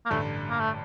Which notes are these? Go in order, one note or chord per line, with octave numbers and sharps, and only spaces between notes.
A#3
A1 G2 D3 A3
A#3
A3